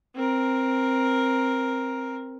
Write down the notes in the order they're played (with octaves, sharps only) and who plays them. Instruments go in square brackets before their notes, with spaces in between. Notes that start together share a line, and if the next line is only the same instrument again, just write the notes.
[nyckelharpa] C4 A#4